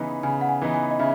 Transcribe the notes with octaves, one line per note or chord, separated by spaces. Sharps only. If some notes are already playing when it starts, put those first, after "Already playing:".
Already playing: C#3 E3 B3 D#4
C#3 G#5
F#5
G#5
E3 B3 D#4
G#5
D#5
C#3 E5